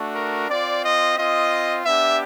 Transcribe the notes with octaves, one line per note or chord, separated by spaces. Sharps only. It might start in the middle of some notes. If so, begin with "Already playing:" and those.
Already playing: A3 D4 F#4
A#4
C4 F4 D5
D#5
C4 F4 D#5
B3 D4 G4 E5